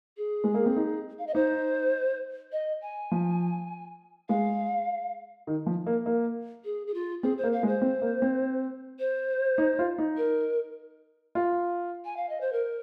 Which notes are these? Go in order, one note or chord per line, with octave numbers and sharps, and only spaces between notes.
G#4
G#3
A#3
C4
D#4
F5
D#5
D#4 C5
D#5
G#5
F3
G#3 F5
D#3
F3
A#3
A#3
G#4
G#4
F4
C4 G#4
C5
A#3
F5
G#3
C5
C4
A#3
C4
C5
D#4
F4
D#4
A#4
F4
G#5
F5
D#5
C5
A#4